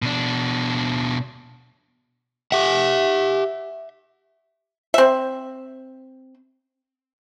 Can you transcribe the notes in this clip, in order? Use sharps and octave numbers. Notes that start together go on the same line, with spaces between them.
B2 D4
G4 E5 F#5
C4 E5